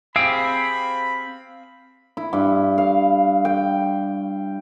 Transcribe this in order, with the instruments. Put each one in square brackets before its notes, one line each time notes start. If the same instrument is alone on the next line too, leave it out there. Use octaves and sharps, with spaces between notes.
[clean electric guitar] C4 G4 G#4 [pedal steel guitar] F5 E6 [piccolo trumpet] B5 [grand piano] D7
[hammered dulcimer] E4
G2
F5
G5